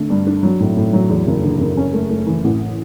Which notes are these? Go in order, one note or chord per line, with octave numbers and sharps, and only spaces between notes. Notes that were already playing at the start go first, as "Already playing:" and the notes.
Already playing: D3 A3
G2
D4
F#3
A2
A2
F#3
E2
F#1
D3
F#1
C#4
A3
A3
E3
A1